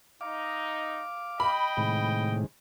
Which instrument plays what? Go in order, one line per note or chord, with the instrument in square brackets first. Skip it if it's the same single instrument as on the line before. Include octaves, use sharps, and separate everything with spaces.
[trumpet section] D#4 [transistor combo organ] F5 D6
[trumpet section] D#5 G5 [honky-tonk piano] B5
[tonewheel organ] A2 [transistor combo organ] C3 D#3 G#3